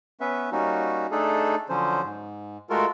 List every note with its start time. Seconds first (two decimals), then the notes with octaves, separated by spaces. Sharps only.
0.20 B3 C#4 B4 E5
0.52 G3 A#3 C#4 D#4 F#4
1.11 A3 D4 D#4 G#4 A4
1.69 D3 F3 F#3 C#4 C5
2.04 G#2
2.70 G#3 A3 F4 F#4 A4 A#4